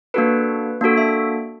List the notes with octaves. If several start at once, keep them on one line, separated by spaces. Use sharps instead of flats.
A#3 D4 F#4 A4 B4
A#3 D4 F#4 A4
E5